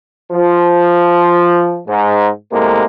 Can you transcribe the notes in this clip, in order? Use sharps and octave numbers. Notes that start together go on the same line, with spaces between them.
F3
G#2
A2 C3 G#3 A#3